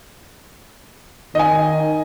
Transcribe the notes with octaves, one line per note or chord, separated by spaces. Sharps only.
D#3 D#5 G#5